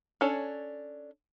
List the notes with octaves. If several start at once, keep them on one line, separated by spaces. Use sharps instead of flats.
C#4 D4 A4 C#5